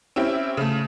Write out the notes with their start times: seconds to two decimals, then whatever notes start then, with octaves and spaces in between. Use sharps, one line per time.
0.16 C4 C#4 E4 G4 E5
0.57 C#3 A3